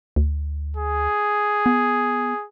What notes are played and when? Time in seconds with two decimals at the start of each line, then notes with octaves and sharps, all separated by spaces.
0.16 D2
0.77 G#4
1.66 B3